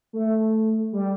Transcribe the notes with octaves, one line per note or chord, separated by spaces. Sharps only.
A3
G3